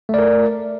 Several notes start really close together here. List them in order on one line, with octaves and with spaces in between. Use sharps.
A3 D5 A#4